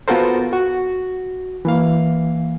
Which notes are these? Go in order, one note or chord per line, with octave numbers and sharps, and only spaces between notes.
B3 F4 F#4 A4 A#4 C5
F#4
E3 A#3 F5